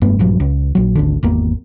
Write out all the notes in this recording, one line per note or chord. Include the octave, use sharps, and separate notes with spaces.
F1 G2 A3 B3
A#1 G2 F3 F#3
C#2
A#1 F#3
G#1 D2 D3
G#1 E2 A#3